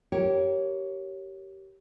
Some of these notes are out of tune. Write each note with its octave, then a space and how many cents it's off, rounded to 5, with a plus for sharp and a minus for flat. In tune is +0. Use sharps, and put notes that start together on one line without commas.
G4 -20 A#4 +10 C#5 +0